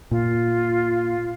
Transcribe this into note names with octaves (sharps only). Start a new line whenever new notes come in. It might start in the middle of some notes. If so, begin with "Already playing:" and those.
A#2 F4